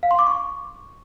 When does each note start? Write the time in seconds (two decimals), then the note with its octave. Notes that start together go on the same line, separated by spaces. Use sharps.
0.03 F5
0.11 C6
0.19 D6
0.26 C#6